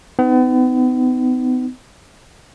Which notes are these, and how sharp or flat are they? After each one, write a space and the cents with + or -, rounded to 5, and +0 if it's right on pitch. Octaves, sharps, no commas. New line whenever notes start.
B3 +40 D#4 +0